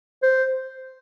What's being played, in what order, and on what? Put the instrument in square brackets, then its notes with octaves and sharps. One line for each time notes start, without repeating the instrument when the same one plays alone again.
[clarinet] C5